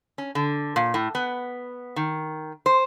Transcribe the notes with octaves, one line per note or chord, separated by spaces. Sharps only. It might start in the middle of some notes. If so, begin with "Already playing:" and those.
C#4
D3
A#2
A2
B3
D#3
C5